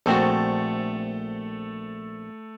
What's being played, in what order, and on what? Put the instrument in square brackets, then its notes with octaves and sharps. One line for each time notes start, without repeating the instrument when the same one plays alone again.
[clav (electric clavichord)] A#1 C4 F#4 [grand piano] A3 A4